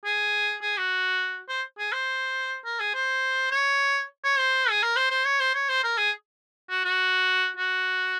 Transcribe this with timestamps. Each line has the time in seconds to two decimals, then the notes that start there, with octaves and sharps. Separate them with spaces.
0.05 G#4
0.62 G#4
0.77 F#4
1.49 C5
1.78 G#4
1.93 C5
2.65 A#4
2.80 G#4
2.94 C5
3.51 C#5
4.24 C#5
4.39 C5
4.70 G#4
4.83 A#4
4.96 C5
5.11 C5
5.25 C#5
5.40 C5
5.54 C#5
5.69 C5
5.84 A#4
5.98 G#4
6.70 F#4
6.84 F#4
7.57 F#4